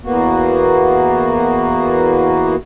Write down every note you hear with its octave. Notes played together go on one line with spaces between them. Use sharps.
E2 A#3 B3 F#4